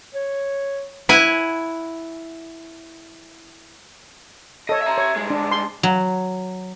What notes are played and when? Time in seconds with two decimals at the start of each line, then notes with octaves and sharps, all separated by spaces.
0.14 C#5
1.09 E4 F#5 G#5
4.69 A4 C#5 D#5
4.82 E5 A#5
4.98 C#5
5.16 G2 G#3
5.30 D4
5.51 C6
5.83 F#3